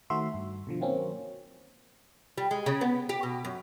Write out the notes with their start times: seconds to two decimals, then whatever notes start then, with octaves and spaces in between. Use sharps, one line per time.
0.10 D#3 A3 F#4 C5 E5 C6
0.34 G2
0.67 B2 D3 F3
0.80 D#3 F#3 A#3 C4 C#4
2.38 G3
2.51 G#3
2.66 C#3
2.81 B3
3.09 G4
3.23 B2
3.45 F#2